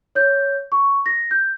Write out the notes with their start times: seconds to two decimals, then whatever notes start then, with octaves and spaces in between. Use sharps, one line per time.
0.15 C#5 G6
0.72 C#6
1.06 A#6
1.31 G6